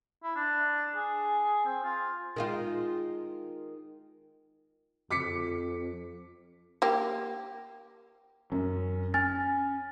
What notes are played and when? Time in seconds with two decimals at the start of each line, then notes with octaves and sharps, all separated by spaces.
0.23 E4
0.36 D4
0.96 G#4
1.65 C4
1.84 F4
2.36 D#3 G#3 F4
5.11 F2 D6 B6 C#7
6.82 A#3 G4
8.52 F#2 C#4
9.14 C#4 G#5 F6 A6